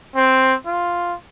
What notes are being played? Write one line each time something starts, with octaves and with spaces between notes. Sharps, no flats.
C4
F4